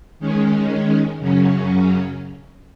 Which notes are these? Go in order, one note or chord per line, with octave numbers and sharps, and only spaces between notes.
D#3 G#3 C#4
F#2 C#3 F#3 C#4